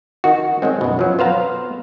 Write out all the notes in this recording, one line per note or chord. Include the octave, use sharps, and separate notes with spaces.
D#3 F#4
D#3 F#3 G#3 C4
F#2 B2
F3 F#3
B3 C5 F5 A#5